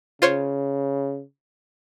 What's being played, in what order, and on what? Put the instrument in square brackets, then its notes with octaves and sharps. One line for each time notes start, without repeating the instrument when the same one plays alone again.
[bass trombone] C#3 [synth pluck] F4 C5 C#5